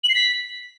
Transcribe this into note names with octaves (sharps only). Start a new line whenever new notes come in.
F#7
C7
B6